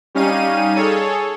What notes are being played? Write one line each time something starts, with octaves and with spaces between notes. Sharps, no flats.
G3 C#4 D#4 F5 D#7
G#4 A4 C#5